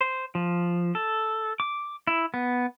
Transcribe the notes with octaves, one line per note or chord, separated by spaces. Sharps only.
C5
F3
A4
D6
E4
B3